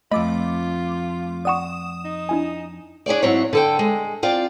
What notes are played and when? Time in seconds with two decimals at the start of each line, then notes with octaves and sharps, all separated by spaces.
0.12 F2 A3 F4 D#5 B5 D6
1.45 D5 F#5 C#6 D#6 E7
2.05 D#4
2.29 D4 E4 G#5
3.06 D4 G#4 C#5 D5
3.23 G#2 F#3 C4 E4 C#5
3.53 D3 A4 G5
3.79 G#3
4.23 C4 F4 D5